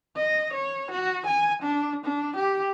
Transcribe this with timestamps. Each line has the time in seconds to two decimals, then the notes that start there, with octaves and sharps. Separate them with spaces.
0.16 D#5
0.53 C#5
0.91 F#4
1.26 G#5
1.63 D4
2.05 D4
2.36 G4